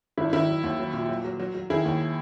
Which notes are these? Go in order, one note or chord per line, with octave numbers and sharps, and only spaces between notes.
G#1 E4
D#3 E4
F#3
D#2
F#3
A#2
F#3
F#3
F#3
F#3
D#3 E4 G#4
D#2